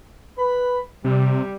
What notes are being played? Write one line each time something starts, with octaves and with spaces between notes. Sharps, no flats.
B4 B5
C3 G3